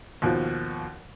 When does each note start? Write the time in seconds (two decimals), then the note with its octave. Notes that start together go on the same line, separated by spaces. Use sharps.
0.22 D#2 B2 F3